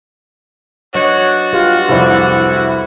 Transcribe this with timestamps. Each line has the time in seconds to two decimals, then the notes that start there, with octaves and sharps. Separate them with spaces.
0.95 F#3 D4 F#4 B4 C#5 D#5
1.53 F4 G4 B4
1.89 C2 F2 E4 A4 C5 D5